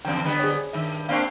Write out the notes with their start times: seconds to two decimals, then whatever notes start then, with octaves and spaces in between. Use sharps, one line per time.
0.05 E2 G2 D3 F5 G5
0.24 D3 G3 B3 D#5 B5
0.39 G#4 C5 C#5
0.73 G2 D#3 E5
1.09 A#3 C4 D4 F5 C#6